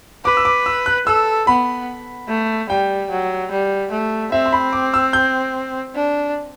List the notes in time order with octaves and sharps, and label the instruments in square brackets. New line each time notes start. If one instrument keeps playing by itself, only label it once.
[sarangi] B4 [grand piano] D6
[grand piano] E6
D6
E6
F#6
[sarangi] A4 [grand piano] E6
[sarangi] B3 [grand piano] B5
[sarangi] A3
[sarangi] G3 [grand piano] G5
[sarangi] F#3
G3
A3
[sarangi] C4 [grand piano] E5
[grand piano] C6
B5
D6
E6
G6
[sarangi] D4